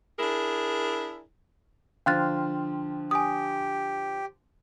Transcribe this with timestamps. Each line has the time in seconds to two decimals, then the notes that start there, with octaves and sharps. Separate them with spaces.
0.19 D4 E4 G#4 A#4
2.06 D3 F3 F5 G5 C6 F6 F#6 A6
3.11 G4 G#5 D#6